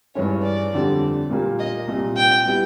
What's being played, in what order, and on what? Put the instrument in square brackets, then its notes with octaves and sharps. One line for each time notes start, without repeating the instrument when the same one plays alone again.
[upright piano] G2 E3 G#3 C#4 [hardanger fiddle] C#5
[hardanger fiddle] D5
[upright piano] F2 D3 G3 C4
A#2 G3 A#3
[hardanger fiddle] D#5
[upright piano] C2 A#2 G3
[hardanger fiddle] G5
[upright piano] G3 B3 E4